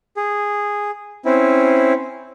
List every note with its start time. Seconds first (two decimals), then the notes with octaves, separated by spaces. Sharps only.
0.17 G#4
1.25 C4 C#4 E4